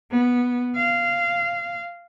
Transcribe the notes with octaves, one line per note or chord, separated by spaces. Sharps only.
B3
F5